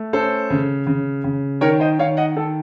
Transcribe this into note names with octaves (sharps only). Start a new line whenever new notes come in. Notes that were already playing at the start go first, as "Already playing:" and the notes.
Already playing: A3
C#4 A4 C5
C#3
C#3
C#3
D#3 A#4 C#5
C5 D#5
D#3 C#5 F5
D#5 F#5
D#3 A4